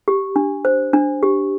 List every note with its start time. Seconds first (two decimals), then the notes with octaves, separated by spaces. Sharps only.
0.08 G4
0.36 D4
0.65 C5
0.93 D4
1.23 G4